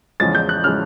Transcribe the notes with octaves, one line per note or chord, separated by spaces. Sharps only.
E2 C#3 F3 G#3 A6
G6
F#6
C#3 F3 G#3 F6